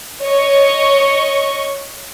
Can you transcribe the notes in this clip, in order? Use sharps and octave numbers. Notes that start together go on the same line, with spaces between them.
C#5 D#5 C#6